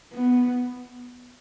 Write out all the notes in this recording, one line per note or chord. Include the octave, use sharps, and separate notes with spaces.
B3